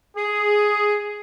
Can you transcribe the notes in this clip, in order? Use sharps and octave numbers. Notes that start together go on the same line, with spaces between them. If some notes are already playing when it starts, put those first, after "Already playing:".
G#4